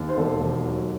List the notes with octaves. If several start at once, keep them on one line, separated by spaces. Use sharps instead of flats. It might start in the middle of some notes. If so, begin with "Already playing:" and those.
Already playing: D#2
C5
E1 A4
D#2
F#3